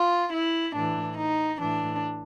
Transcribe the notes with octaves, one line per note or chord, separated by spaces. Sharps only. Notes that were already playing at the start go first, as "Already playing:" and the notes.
Already playing: F4
E4
A2 E3 D4
D#4
A2 E3 D4